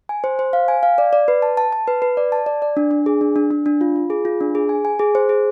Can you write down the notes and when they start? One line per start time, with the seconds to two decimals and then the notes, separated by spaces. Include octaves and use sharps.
0.09 G#5
0.24 C5
0.39 C5
0.53 F5
0.68 G#5
0.83 F5
0.98 D5
1.13 D5
1.28 B4
1.42 A5
1.57 A5
1.72 A5
1.87 B4
2.02 B4
2.17 D5
2.32 A5
2.46 D5
2.62 D5
2.77 D4
2.91 D4
3.06 G#4
3.21 D4
3.36 D4
3.51 D4
3.66 D4
3.81 F4
3.96 F4
4.10 G#4
4.25 F4
4.41 D4
4.55 G#4
4.69 G#5
4.85 G#5
4.99 G#4
5.15 C5
5.29 G#4